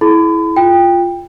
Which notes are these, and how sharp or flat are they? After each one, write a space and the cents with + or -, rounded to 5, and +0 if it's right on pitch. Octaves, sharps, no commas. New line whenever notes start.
E4 -5 G#4 +45 B5 +40
F4 +0 G5 +15